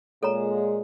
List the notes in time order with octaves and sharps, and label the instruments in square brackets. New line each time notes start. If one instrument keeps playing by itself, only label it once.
[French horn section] A#2 G#3 [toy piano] A4 C#5 A#5